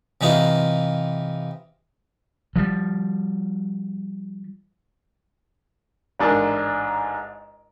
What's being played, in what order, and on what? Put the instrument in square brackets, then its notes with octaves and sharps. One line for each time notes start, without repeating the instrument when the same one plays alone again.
[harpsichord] C3 E3 D#4 F4
[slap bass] F3 G3
[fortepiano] A1 G#2 D4 A#4 A5